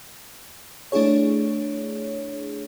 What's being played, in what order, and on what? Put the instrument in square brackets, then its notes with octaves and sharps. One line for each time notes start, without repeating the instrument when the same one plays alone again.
[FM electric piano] A3 D4 E4 G#4 C#5